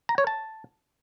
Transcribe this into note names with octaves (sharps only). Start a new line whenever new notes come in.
A#5
C#5
A5